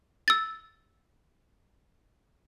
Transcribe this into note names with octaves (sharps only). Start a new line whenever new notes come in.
E6 A6